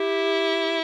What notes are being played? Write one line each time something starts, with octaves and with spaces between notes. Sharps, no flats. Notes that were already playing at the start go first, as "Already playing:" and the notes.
Already playing: E4 G4